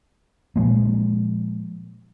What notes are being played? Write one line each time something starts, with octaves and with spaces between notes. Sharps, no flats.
A#2 F3 G#3 A#3